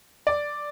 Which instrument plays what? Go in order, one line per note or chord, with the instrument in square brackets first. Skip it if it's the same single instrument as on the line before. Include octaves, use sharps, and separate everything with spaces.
[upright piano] D5